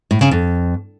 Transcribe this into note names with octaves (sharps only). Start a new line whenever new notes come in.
A2
C#3
F2